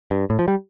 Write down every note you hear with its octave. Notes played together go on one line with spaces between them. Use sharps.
G2
A2
F3
G3